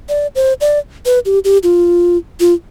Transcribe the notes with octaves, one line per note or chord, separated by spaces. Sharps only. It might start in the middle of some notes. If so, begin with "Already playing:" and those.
D5
C5
D5
B4
G4
G4
F4
F4